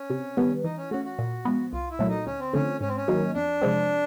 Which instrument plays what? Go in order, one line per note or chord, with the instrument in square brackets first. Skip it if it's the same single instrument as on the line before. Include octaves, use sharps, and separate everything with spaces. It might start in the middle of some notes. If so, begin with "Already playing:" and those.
Already playing: [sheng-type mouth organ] C#4
[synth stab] C3
D#3 G3 B3
[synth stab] E3 [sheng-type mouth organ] D#4
[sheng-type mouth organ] C#4
[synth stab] A3 C#4 [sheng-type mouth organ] F#4
[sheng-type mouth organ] F#4
[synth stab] A#2
F3 G#3 B3
[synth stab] C2 [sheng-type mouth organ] F4
[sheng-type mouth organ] E4
[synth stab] A#2 F#3 A3
[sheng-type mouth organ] D#4
[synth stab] D2 [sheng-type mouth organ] C#4
[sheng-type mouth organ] C4
[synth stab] D3 F3 A3 C4 [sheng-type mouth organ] C#4
[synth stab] G#2 [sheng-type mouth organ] C#4
[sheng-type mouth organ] C4
C#4
[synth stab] D#3 F#3 A#3 D#4
[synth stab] F2 [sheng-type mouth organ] D4
[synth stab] C3 F3 G#3 C4